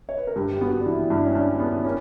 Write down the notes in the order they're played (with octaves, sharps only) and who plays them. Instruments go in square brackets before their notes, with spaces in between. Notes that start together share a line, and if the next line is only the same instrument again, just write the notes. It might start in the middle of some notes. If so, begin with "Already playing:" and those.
[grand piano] C#5
B4
A#4
[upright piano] G2 [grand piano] G4
[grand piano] G4
[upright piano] B3 [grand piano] F#4
[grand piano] D4
[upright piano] E3 [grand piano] E4
[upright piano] G2 [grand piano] E4
[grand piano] D4
C#4
[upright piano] G2 [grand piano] D4
[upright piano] B3
[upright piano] A#3 [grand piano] C#4